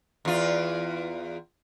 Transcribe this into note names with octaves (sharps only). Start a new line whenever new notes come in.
E2 F4